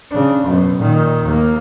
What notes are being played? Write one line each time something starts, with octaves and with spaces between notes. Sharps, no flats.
C#3 D4
F#2 B2
A#2 D#3
D#2 A#3